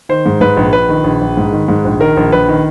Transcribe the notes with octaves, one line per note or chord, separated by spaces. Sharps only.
D#3 C5
G#2
G#2 B4
A#1
A#1 B4
D#3
A#1
A#1
G#2
D#3
G#2
A#1
D#3 A#4
A#1
A#1 B4
D#3